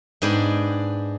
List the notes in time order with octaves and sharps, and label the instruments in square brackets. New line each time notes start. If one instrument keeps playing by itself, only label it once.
[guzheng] G#2 B3 D4 G#4 G5